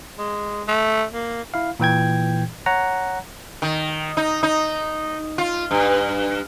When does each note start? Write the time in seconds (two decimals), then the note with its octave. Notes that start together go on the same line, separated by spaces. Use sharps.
0.19 G#3
0.68 A3
1.13 A#3
1.54 E4 F5
1.80 A#2 E3 G5 G#6
2.66 C#5 F#5 A#5
3.62 D#3
4.17 D#4
4.43 D#4
5.38 F4
5.71 G2